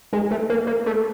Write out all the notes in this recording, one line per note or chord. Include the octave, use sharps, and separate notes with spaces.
G#3
A3
A#3
A#3
A3